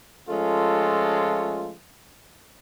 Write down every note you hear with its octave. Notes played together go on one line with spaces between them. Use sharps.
F3 G#3 A3 C#4 F4 A4